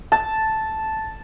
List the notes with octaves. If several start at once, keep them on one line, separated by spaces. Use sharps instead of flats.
A5